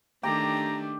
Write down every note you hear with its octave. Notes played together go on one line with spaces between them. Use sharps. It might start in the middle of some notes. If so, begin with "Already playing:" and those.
D#3 A3 D4 G4 A#5